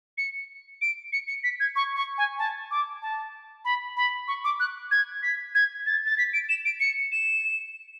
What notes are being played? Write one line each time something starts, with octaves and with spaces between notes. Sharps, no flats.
C#7
D7
C#7
C#7
B6
G#6
C#6
C#6
G#5
A5
D6
A5
B5
B5
C#6
D6
F#6
G#6
B6
G#6
A6
A6
B6
D7
E7
D7
C#7
E7